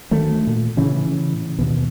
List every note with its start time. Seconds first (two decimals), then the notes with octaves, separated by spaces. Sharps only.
0.11 D2 D#3 A3
0.47 A#2
0.77 A2 C#3 E3 C#4
1.59 D#2 B2